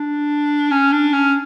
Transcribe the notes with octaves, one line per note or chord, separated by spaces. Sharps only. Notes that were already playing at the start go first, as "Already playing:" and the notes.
Already playing: D4
C#4
D4
C#4